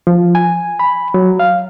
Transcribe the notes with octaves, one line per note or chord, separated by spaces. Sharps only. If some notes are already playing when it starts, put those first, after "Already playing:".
F3
G#5
B5
F#3
F5